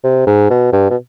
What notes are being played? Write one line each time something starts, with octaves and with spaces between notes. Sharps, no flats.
C3
G#2
B2
G2
B2